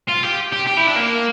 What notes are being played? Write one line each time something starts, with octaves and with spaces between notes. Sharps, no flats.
F4
G4
G4
G4
E4
D4
A#3